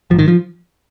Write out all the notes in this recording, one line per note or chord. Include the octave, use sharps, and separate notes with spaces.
A#1 G#2 D#3 F3
F3